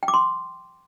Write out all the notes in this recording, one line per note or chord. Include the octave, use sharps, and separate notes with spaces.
G5
D6
C6